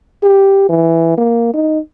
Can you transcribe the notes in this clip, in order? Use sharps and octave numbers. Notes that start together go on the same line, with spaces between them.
G4
E3
A#3
D#4